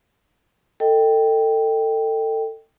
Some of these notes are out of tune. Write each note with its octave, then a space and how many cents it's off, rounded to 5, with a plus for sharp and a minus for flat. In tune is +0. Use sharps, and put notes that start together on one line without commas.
A4 +25 D#5 +5 G5 +0